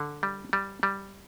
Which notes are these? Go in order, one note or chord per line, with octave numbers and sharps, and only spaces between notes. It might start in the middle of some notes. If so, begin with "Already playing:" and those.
Already playing: D3
G3
G3
G3